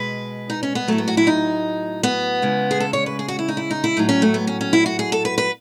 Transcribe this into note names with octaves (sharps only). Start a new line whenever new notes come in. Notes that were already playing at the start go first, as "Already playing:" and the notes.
Already playing: B2 G#3 B4
D#4
C#4
B3
A2 F#3 A3
B3
F#4
E4
D#4
B3
C#3 G#3
G#4
A4
C#5
B4
G#4
F#4
E4
D#4
E4
D#4
E4
A2 F#3 D#4
C#4
A3
B3
C#4
C#4
E4
F#4
G#4
A4
B4
B4